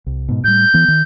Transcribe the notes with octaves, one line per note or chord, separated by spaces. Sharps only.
C2
G#2 B2
A2 G3 G6
E3 B3
D#3